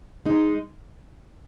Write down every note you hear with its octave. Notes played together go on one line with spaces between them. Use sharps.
G#3 D#4